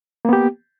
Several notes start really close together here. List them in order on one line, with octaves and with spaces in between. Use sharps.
A#3 B3 G4